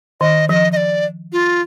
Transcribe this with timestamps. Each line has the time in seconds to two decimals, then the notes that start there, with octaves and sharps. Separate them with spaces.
0.21 D#3 D#5
0.49 F3 D#5
0.72 D#5
0.76 D5
1.32 F4